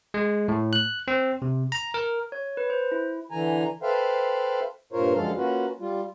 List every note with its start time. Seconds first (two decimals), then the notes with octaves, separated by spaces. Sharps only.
0.14 G#3
0.48 A2
0.73 F#6
1.08 C4
1.42 C3
1.72 A#5
1.94 A#4
2.32 C#5
2.57 B4
2.70 C5
2.92 E4
3.31 D3 E3 G#5 A#5
3.83 A4 B4 C5 E5 F5 G5
4.93 G2 A#2 F4 A#4 C5 C#5
5.15 F#2 D3 F3 G#3 A4 F5
5.37 A#3 C#4 F4 F#4 B4
5.80 G3 F4